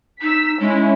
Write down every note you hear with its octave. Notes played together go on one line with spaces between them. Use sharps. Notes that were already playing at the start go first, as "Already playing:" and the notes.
D#4 E6 B6
G#3 C#4 E4